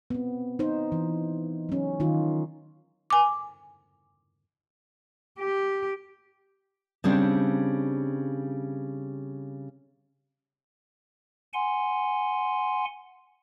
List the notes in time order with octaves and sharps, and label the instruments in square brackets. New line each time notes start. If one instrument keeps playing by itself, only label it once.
[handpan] B3 C4
D#4 C5
E3
F#3 C#4
D#3 D#4 F4
[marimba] G#5 D6
[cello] G4
[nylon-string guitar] C#3 G3 C4 D4
[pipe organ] F#5 G#5 C6